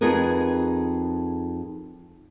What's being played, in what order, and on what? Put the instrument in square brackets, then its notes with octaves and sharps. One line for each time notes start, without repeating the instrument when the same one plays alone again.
[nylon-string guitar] F2 D#4 G#4 A#4 B4